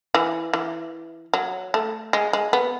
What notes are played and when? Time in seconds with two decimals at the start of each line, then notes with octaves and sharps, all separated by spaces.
0.14 E3
0.54 E3
1.34 F#3
1.74 A3
2.13 G#3
2.33 G#3
2.53 B3